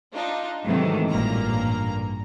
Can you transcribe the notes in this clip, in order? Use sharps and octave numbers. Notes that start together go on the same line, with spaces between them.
D4 D#4 F4
G#2 C3 D#3 E3 F#3 A3
A1 G2 A#2 A#3 A#5